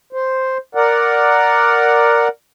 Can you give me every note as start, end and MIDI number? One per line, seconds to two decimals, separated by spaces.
0.13 0.58 72
0.75 2.28 70
0.75 2.28 74
0.75 2.28 78